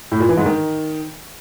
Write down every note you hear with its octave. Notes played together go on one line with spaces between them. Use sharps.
A2
A#2
E3
G#2
D#3